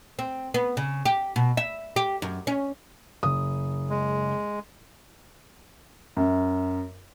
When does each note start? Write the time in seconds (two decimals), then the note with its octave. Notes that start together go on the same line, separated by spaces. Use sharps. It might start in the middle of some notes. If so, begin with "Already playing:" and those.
0.19 C4
0.54 B3
0.77 C#3
1.06 G4
1.36 B2
1.57 E5
1.96 G4
2.22 F#2
2.47 C#4
3.23 F#1 D#6
3.90 G#3
6.17 F#2